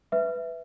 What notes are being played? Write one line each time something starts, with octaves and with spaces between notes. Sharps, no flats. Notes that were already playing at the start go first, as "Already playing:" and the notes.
B4 E5